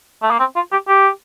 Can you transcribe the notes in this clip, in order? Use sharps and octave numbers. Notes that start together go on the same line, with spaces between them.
A3
A#3
C4
F4
G4
G4